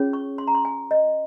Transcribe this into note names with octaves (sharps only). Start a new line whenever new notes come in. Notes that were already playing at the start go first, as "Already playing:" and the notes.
Already playing: C#4 F4 G#4 C#5
C#6
C6
A#5
C6
G#5
D#5